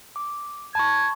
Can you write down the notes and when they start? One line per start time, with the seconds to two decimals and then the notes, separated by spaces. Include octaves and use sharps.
0.16 D6
0.75 A5 B5 C#6 G#6